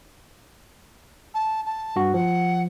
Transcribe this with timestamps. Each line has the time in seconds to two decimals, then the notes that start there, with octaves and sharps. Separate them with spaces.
1.34 A5
1.66 A5
1.96 G2 F#4
2.14 F3 F#5